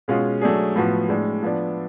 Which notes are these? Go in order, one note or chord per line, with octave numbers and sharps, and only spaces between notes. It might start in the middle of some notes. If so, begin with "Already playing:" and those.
B2 G#3 C#4 F4
F#3 A3 D4 G#4
A2 F3 B3 F#4
A2 G#3 D4
F3 B3 D4